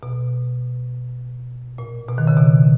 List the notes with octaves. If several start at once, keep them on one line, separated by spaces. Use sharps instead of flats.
B2
A#2
B2
D#3
C#3
B2